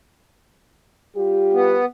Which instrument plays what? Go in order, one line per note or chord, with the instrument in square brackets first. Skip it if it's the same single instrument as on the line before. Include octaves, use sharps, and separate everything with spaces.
[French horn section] G3 F4 G4
[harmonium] B3